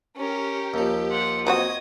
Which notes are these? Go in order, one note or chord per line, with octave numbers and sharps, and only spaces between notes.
C#4 G4 A#4
D#2 F3
F4 F#5
F#3 C4 F#4 D#5 D#6 G#6